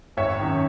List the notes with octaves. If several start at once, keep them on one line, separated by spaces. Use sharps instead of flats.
G#1 C#5 E5
F#2 D#3